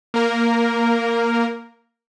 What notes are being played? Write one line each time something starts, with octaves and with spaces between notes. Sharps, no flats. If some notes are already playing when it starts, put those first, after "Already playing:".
A#3 A#4